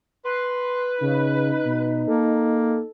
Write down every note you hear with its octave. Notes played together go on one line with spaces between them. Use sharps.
B4 C6
C#3 D#4
B2
A#3 A4